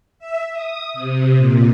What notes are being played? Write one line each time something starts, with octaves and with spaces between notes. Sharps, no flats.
E5
D#6
C3
A#2